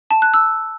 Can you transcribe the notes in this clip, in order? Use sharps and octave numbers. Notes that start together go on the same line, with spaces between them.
A5
F#6
E6